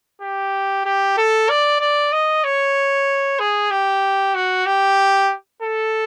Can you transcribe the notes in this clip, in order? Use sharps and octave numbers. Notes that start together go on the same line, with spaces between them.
G4
G4
A4
D5
D5
D#5
C#5
G#4
G4
F#4
G4
A4